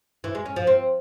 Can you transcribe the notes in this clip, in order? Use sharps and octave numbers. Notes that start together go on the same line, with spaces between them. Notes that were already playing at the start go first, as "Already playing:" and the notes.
E3
G#3
C#4
F3
C4